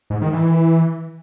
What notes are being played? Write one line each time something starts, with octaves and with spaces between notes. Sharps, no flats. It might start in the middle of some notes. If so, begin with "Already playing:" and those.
G#2
D#3
E3